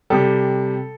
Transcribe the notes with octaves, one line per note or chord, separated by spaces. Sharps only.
C3 G3 A4